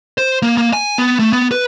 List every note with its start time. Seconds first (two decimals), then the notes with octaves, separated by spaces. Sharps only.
0.18 C5
0.42 A#3
0.58 A#3
0.73 G#5
0.98 B3
1.19 A3
1.33 B3
1.51 B4